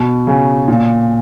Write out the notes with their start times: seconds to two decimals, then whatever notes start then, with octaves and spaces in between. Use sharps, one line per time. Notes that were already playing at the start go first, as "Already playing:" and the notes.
Already playing: B2
0.27 C#3
0.68 A#2